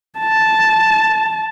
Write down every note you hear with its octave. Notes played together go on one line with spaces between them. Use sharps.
A5